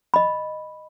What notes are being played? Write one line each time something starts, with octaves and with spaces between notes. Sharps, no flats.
D#5 B5